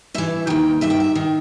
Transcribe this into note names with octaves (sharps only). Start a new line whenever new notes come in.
G2 E3 E5
D#2 D#3 G5
G2 D#3 E5
G5
E5
D#3